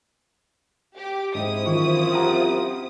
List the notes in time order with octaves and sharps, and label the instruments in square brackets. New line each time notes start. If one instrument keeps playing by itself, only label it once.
[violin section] G4 D6
[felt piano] G#2 [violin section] C4 E4 D#6
[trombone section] F#2 F4 [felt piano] D#3 E3 C#6
[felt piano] G4 F#5 A#5